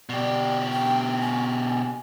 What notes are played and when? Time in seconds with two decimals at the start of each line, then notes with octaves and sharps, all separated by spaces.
0.09 B2 G4 D5
0.71 G5
1.20 G#5